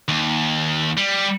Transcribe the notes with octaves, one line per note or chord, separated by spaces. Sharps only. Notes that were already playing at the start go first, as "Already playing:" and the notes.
D#2
G3